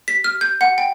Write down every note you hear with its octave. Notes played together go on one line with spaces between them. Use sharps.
B6
F6
G6
F#5
G5